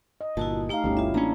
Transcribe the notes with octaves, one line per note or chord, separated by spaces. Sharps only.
D#5
G1 A#2 E4 F#4 A5
A3 D#4 G4 F5 A#5
G1 D2 G3 C#4 G4
E4 F4 E5
A1 A#3 C#4 D4 A#5